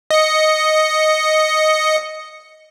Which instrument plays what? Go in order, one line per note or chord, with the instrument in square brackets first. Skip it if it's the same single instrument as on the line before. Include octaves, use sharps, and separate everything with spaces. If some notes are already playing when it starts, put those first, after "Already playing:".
[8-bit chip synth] D#5 C#7